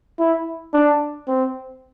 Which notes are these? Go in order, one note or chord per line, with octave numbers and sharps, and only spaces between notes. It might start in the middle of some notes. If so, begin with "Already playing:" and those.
E4
D4
C4